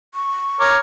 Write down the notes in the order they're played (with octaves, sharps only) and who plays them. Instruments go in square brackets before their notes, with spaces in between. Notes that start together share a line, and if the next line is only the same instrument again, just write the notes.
[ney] C#6
[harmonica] A#4 C#5 D6